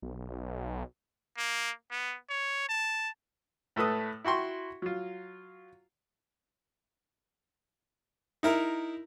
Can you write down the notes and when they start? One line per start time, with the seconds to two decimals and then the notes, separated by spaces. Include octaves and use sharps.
0.02 B1
1.37 A#3
1.91 B3
2.29 C#5
2.69 A5
3.76 A2 A3 A4 B4 D#6
4.24 E4 F#4 G5 C6 C#6
4.82 F#3 F4
8.43 D#4 E4 A#4